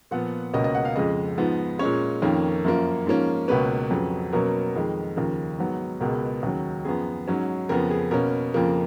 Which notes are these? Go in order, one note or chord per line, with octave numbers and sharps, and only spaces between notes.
A#2 F3 B3 F#5
C#2 B2 A#3 C#4 D#5
D#5
F#5
F5
F2 C#3 G#3 D#5
G#2 F3 B3
A#2 G#3 C#4 C#5
F2 D#3 A#3 C#4
F#2 F3 A#3
G#2 F3 A#3 C#4
C#2 B2 A#3 C#4 B4
F2 C#3 F#3
B2 F#3 A#3 C#4 A#4
F2 D#3 G#3
D#2 C#3 F3 A#4
G#2 F#3 B3
C#2 B2 G#3 B3 A#4
D#2 C#3 F#3
F#2 F3 B3 G#4
G#2 F#3 C#4
F2 C#3 F3 B3 A#4
G#4
B2 A#3 C#4 A#4
F2 C#3 F3 A#3